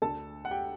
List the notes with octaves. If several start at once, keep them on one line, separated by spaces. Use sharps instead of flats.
D2 D3 A4 A5
F#5
G4 G5